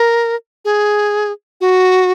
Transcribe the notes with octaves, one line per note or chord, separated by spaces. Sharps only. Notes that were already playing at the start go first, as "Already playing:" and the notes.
Already playing: A#4
G#4
F#4